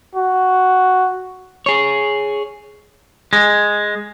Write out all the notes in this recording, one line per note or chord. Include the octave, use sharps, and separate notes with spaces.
F#4
G#4 C#5
G#3